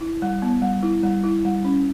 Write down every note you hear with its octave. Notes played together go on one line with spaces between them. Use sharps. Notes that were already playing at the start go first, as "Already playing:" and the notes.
E4
G3
B3
G3
E4
G3
E4
G3
C#4